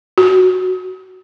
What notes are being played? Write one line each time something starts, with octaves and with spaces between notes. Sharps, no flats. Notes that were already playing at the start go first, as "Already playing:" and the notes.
F#4